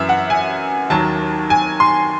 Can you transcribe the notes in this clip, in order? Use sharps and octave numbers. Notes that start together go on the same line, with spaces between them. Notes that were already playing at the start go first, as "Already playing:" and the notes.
Already playing: F#2 E3 E5
F#5
G#5
D#2 D#3 F#3 A5
G#5
C6